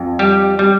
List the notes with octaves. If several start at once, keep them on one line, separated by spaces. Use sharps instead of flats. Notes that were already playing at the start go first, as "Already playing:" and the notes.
Already playing: F2
G3 G4
G3